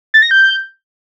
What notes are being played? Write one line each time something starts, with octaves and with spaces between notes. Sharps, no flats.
A6
A#6
G6